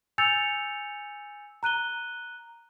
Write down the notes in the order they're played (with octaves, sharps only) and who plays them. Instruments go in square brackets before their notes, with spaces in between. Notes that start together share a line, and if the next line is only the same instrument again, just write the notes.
[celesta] G#5 E6 G6 A6 C#7 F7
A#5 F#6 D#7 G7